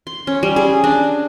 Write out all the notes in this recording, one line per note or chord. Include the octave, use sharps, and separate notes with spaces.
C6
C#4
G3
G#4
D4